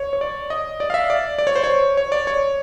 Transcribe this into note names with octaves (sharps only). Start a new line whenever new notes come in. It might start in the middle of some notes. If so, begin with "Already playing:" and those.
Already playing: C#5
C#5
D5
D#5
D5
F5
E5
D5
D5
C#5
C5
C#5
C#5
D5
C#5